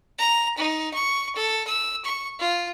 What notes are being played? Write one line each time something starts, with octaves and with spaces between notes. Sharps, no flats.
A#5
D#4
C#6
A4
E6
C#6
F4